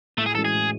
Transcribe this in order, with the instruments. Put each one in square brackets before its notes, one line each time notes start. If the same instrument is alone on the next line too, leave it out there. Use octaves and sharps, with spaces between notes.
[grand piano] A2 [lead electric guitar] A3
[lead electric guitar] G#4
[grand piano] E3 G#3 C#4 F#4 [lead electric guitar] A4
[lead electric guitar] G#4
[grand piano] A2